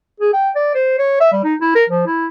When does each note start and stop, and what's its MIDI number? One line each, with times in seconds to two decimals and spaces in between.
0.20 0.32 68
0.33 0.50 79
0.55 0.74 74
0.74 0.95 72
0.98 1.20 73
1.20 1.31 76
1.32 1.41 55
1.44 1.55 63
1.61 1.71 64
1.75 1.84 70
1.89 2.04 53
2.06 2.27 64